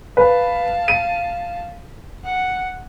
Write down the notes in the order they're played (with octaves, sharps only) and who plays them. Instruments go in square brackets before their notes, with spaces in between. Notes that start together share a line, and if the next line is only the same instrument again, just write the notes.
[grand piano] B4 [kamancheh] F5 A5
[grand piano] D#7
[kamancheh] F#5